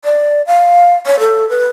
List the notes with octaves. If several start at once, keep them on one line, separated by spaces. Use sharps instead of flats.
D5
F5
C#5
A4
B4